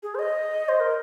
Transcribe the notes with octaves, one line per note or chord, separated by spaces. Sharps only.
G#4
C5
D#5
C5
A#4